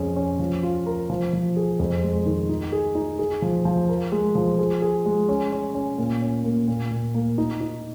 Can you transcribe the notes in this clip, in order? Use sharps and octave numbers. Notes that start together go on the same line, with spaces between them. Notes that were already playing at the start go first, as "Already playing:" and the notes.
Already playing: F2 C#4 G#4
C#4
F3
F4
A#4
F3
F3
G#4
F2
G#3
D#3
D#4
G#4
D#4
G#4
F3
F3
A#4
G#3
F3
G#4
G#4
G#3
C#4
C#4
C#4
A#2
C#4
A#3
A#2
A#2
A#3
D#4
D#4